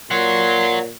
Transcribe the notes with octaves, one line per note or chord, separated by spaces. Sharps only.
A#2 C#5 F#5 C6